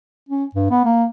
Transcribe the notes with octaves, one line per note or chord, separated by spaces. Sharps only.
C#4
G2
B3
A#3